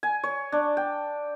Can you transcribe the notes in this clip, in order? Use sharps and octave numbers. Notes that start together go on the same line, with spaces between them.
G#5
C#5
D4
G5